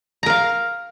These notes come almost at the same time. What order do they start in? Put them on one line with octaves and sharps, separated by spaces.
A#5 A#4 F5